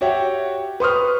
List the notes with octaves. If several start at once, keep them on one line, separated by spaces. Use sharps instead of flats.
F#4 G4 C#5 E5 F#5 G5
B4 C5 C6 C#6 D#6 F6